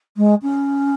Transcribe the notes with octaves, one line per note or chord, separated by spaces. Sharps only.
G#3
C#4